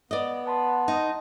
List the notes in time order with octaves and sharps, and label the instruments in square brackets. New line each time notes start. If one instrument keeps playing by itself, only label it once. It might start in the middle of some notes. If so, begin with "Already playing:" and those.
[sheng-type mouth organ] B3 [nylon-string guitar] D5 D#5
[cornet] B4 [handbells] F#5 A5 C6
[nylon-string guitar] D#4 [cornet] D#5